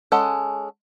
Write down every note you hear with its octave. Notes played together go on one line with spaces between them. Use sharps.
G#3 C#4 A4 F#5